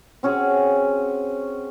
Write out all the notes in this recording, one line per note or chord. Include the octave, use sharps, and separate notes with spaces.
C4 C#4 F#4 G#4